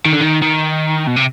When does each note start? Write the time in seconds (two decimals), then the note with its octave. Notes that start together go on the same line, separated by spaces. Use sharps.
0.06 D#3
0.13 D3
0.21 D#3
0.42 D#3
1.07 B2
1.16 C3